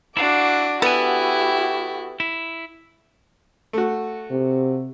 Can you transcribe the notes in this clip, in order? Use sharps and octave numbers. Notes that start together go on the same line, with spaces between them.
D4 E4 F#4 F5 D6
B3 E4 F#4 G4 A4 G#5
E4
A3 F#4
C3